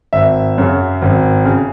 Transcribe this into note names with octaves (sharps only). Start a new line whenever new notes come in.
G#1 E5
F#2 C#3
G#1
C#3